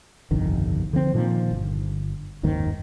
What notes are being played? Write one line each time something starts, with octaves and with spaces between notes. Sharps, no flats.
G1 C2 F2 D#3
D3 F3 C4
A#2 D#3 F3
G1
F#1 D#2 G#2 D#3